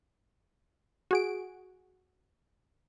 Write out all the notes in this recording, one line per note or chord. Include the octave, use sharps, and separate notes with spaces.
F#4 G#4 D7